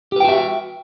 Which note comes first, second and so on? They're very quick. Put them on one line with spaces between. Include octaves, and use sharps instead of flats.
G4 B4 G5 F#4 E5